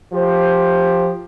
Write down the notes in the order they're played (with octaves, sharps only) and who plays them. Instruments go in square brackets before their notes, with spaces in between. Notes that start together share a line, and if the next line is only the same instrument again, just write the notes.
[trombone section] F3 G4 C5